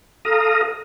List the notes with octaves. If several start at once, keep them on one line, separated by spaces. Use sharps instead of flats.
A4 F5 A#5 D#6